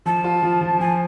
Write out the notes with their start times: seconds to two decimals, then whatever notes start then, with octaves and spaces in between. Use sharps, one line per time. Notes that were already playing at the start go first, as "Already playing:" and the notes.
0.06 F3 A5
0.24 F4
0.43 F3
0.61 F3
0.79 F3 G#5